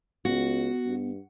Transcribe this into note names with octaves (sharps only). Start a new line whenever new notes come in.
C#2 B3 F#4
G2